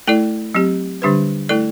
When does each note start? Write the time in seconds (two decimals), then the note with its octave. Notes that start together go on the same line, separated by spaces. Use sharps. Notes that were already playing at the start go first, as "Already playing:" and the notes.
0.07 A3 E4 A4 D5
0.55 F#3 C4 G4
1.02 D3 G3 D4 G4 B4
1.49 A3 E4 A4 D5